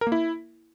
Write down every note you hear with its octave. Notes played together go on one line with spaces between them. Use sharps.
A#4
A#3
E4